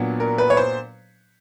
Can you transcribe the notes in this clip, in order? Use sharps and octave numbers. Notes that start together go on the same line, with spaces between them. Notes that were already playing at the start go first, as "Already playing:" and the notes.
Already playing: A#2 F#3 B3 D4
A#4
B4
C#5
C5